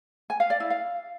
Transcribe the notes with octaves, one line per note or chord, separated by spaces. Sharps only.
G#5
F5
D5
E4
F5